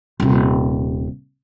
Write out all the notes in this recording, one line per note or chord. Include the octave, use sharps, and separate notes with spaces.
D#1 C3